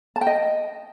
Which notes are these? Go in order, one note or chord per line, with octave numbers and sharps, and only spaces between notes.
A5
G5
D#5